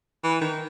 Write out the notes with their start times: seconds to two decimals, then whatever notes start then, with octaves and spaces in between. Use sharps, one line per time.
0.24 E3
0.41 D#3